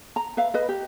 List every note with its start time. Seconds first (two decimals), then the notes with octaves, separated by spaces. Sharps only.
0.16 A#5
0.37 B4 E5 F5
0.54 B4 D#5
0.69 G4